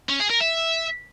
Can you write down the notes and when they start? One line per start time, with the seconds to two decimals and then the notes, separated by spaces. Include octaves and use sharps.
0.09 C#4
0.20 G#4
0.30 A#4
0.41 E5